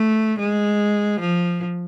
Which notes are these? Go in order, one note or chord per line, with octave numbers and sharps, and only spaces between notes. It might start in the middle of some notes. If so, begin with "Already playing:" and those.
Already playing: A3
G#3
F3